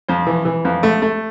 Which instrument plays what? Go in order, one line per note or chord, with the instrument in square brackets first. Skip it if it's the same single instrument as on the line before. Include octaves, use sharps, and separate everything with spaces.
[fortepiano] F2 C5
E3
E3
F2
A3
A3